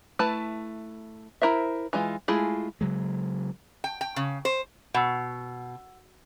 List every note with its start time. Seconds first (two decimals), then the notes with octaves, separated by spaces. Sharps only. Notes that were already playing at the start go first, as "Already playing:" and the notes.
0.19 A3 E4 B4 A5
1.42 E4 A#4 C5 E5
1.93 E3 G#3 F4
2.28 G#3 A3 E4 F4 G#4
2.81 C#3 F#3 G#3
3.84 G5
4.01 G5
4.16 C#3
4.45 C5
4.94 B2 F#5 E6